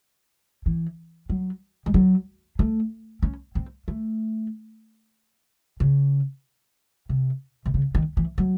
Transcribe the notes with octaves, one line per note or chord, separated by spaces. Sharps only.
E3
F#3
G#3
F#3
A3
C#4
C4
A3
C#3
C3
C3
C#3
D#3
E3
F#3